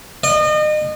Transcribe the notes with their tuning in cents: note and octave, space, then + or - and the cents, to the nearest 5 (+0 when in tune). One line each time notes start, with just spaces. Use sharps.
D#5 -35